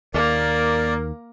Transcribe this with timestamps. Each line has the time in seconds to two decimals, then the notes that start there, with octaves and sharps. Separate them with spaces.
0.14 D#2 A#3 A#4 D5